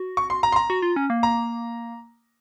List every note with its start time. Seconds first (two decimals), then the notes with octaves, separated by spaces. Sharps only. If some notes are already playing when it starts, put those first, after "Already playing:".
Already playing: F#4
0.17 C#6
0.30 C6
0.43 A#5
0.52 C6
0.56 A#5
0.70 F#4
0.82 F4
0.96 C#4
1.10 A#3
1.23 A#5